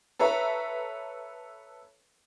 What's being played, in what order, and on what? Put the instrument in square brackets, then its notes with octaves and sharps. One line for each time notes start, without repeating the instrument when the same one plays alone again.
[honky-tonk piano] A4 B4 C#5 E5 A#5